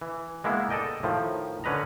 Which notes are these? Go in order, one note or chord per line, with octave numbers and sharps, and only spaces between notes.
E3
G#3 A#3 B3 E4
A4 D5 D#5 G5
A2 D#3 F3
D3 C#4 B4 D#5 A#5